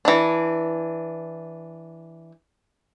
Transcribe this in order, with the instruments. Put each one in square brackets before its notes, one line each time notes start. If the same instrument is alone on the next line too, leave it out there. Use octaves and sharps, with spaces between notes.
[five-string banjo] E3 D4